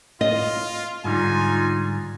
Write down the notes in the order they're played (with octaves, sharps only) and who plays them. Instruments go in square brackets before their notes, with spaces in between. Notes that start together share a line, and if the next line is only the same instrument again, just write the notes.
[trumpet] F4 [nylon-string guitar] D#5
[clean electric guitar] G#2 D3 G3 [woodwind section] D#4 F4 [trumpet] G#5